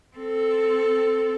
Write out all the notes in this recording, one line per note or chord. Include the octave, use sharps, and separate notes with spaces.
C4 A4